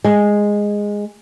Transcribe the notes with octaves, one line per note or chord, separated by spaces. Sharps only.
G#3